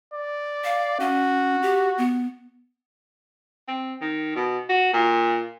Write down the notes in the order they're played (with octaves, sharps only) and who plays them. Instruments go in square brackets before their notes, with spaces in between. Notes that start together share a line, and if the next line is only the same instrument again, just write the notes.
[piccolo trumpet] D5
[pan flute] F5
[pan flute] C#4 [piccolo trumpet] F#4
[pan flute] G4
B3
[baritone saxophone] C4
D#3
B2
F#4
A#2